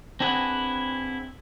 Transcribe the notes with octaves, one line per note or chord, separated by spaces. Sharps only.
C4 D4 E4 G#4 B4 F#5